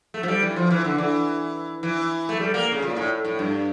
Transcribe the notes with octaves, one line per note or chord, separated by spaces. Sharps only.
A3
F3
G3
E3
F3
E3
D3
E3
E3
A3
G3
A#3
C#3
A#2
A2
A2
G2